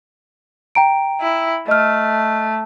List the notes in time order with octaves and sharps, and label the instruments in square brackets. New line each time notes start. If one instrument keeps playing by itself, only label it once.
[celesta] G5 A#5 D7
[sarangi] E4
[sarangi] A3 [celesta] D#5 F6